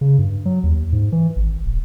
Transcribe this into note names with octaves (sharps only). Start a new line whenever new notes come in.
C#3
G2
F#3
D#2
G#2
E3
G#1
D1